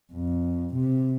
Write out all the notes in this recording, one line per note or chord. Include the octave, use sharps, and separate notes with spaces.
F2
C3